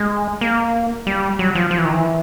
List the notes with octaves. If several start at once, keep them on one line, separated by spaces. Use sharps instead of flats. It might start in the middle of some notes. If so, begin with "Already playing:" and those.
Already playing: G#3
A#3
G3
F#3
F3
F3
E3
D#3
E3